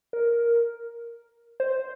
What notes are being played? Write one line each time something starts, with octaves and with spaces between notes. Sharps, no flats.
A#4
C5